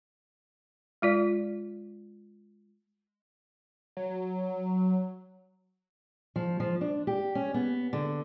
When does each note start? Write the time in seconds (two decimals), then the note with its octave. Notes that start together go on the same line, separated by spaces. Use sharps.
1.02 G#3 F4 D5
3.97 F#3
6.36 F3
6.60 F3
6.81 D4
7.07 G4
7.35 C#4
7.54 B3
7.93 D3